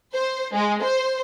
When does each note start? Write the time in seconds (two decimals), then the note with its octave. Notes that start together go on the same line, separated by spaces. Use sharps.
0.14 C5
0.54 G#3
0.83 C5